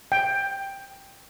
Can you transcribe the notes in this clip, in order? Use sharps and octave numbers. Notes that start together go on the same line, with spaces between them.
G5